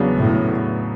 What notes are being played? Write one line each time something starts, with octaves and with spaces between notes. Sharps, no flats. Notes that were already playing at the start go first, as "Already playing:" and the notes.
Already playing: E2 C#3 F#3 B3 D4
A2